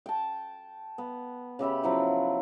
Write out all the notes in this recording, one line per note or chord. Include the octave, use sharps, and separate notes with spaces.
G5 A5
B3
C#3 G4 E5 B5
F3 F#3 E4